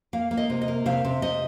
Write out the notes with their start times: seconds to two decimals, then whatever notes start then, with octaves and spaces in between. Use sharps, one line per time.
0.13 A#3 F5
0.31 A#3
0.37 D#5
0.50 C3
0.62 D#5
0.68 A#3
0.86 C3 F5
1.05 C3
1.22 C3 D#5